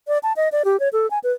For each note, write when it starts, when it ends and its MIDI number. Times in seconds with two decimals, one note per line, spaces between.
0.08 0.18 74
0.23 0.33 81
0.36 0.49 75
0.52 0.63 74
0.65 0.79 67
0.80 0.89 73
0.93 1.09 69
1.11 1.19 80
1.24 1.32 71